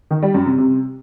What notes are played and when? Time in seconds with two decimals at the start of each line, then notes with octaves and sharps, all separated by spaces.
0.11 D#3
0.22 G3
0.34 F#2
0.46 C3
0.58 C3